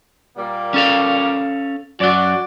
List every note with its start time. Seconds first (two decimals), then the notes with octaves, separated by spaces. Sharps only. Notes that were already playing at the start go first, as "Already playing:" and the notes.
0.38 A#2 G3 A#3
0.74 C#4 A4 F5
2.00 F#2 F#3 F#4 D5